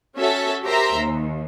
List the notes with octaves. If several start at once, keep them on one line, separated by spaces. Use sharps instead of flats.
C#4 F#4 A4 C#5 E5
G4 A#4 C5 E5 A#5 C6
D#2